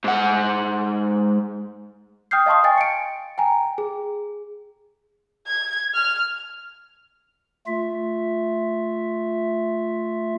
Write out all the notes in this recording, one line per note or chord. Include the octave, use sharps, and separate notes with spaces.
G#2 F#5
G5 D#6 F6 G6 C7
D#5 F5 A5 C6 C#6 D#6
D#5 G5 G#5 A6
C#7 D7
G5 G#5 A#5
G#4
G#6
F6
A3 F4 E5